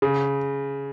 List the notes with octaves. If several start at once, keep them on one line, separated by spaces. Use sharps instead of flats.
C#3